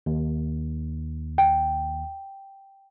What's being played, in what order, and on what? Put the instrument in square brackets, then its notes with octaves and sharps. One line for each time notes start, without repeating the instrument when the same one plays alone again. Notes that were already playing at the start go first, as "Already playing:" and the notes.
[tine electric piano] D#2
[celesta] G5